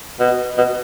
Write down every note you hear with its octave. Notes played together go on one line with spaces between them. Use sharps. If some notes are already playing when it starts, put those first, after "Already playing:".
B2
B2